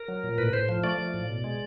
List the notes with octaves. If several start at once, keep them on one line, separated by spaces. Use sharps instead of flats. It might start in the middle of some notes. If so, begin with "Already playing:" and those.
Already playing: A#4
F#3
A#2
A2 B4
A2 C5
F3
A3 D5
F3
A2
B2
G#3